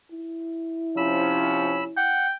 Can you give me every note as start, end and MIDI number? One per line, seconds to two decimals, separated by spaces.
0.11 2.28 64
0.97 1.90 48
0.97 1.90 53
0.97 1.90 61
0.97 1.84 83
0.97 1.84 88
1.97 2.27 78
1.97 2.35 79